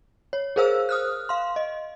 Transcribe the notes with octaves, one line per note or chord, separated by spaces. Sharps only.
C#5
G#4 A#4 C5 F5 E6
D#6 F6 F#6
F5 C6
D#5